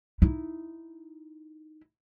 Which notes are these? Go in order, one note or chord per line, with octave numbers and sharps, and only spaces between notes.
D#4 E4